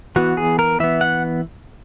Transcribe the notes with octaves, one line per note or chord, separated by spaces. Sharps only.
E3 B3 F#4
G#4
A#4
E3 B3 E5
F#5